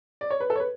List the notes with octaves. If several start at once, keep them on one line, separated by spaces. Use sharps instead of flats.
D5
C#5
B4
A4
C#5
B4